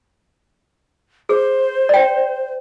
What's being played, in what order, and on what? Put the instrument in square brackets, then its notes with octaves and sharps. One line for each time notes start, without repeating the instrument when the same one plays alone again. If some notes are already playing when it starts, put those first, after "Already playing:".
[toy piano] G#4 [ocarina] C5
[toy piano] D5 G5